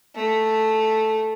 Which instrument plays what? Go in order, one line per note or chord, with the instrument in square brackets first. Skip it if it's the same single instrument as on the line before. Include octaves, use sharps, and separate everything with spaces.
[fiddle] A3